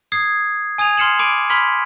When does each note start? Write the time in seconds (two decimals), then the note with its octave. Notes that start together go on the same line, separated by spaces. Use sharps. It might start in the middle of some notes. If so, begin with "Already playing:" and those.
0.12 D#6 G#6 C7
0.78 G#5 D#6 G#6 D#7 F7
0.97 C6 F6 C7 C#7 E7 F#7
1.19 B5 D6 D7 D#7
1.50 B5 C6 F6 G#6 B6